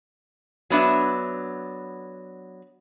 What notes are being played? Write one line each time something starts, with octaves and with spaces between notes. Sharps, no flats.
F#3 B3 D4 E5